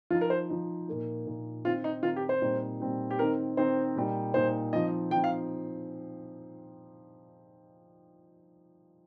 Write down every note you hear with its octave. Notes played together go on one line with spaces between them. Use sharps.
F3 D#4 F4
A#4
C5
F3 D#4
A#2 A#3 D#4
A#2 A#3 D#4
D#3 C4 D#4 F4
D#4
D#3 C4 D#4 F4
G4
C5
A#2 G3 C4 D#4
A#2 G3 C4 D#4
G4
D#3 C4 D#4 A#4
D#3 C4 D#4 C5
A#2 G3 D#4
A#2 G3 D#4 C5
F3 C4 D#4 D#5
F3 C4 D#4 G5
F5